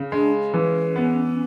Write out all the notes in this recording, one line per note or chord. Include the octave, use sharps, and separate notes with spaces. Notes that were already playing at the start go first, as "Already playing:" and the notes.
Already playing: C#3
G#3 D4
E3 C#4
B3